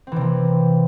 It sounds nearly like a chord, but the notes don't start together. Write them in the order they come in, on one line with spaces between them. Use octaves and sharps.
C4 E3 C3 A#3